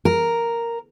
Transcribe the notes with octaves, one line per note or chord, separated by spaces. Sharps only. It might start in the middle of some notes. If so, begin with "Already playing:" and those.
A#4